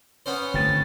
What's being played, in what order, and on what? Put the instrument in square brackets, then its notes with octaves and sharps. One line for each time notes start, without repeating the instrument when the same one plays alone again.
[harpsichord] B3 C#4 C5
[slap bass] G1 D#3 A3 [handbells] C4 A6